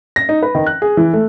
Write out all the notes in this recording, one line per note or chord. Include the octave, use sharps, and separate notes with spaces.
A#6
D#4
B4
D#3
F#6
G#4
E3
A3